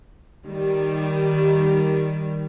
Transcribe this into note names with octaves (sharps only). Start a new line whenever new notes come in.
D#3 G3